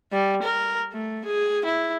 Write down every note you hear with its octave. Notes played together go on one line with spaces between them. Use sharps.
G3
A#4
A3
G#4
E4